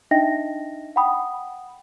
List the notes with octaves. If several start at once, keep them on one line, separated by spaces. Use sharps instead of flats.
D4 D#4 D#5 E5 G5 A#6
F#5 G5 B5 D#6